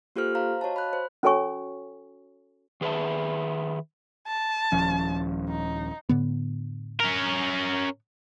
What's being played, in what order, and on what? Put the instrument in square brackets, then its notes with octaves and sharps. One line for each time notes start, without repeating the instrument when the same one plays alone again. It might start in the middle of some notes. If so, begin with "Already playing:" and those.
[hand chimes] A#3 F4 G4 A4 C5 F6
C5 F5 A#5
F#4 C#5 D#5 F5 A5
B5 F#6
C5
[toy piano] C#4 F#4 A4 C#5 G#5 C#6
[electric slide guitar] D#3 G#4 B4 C#5 E5 A5
[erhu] A5
[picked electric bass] D#1 F3 C#4
[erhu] D#4
[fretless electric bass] A2 D3 B3
[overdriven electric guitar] C#4 A#4